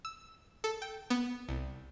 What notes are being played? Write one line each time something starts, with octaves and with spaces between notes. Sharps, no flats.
E6
A4
G5
B3
C2